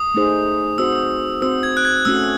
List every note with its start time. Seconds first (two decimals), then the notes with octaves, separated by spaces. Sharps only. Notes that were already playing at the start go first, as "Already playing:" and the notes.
Already playing: D#6
0.14 A3 D#4 G#4 C5
0.78 C4 F#4 C5 E6
1.42 C4 F#4 C5 E6
1.63 G#6
1.77 F#6
1.85 G#6
2.05 A3 C#4 F#4 E6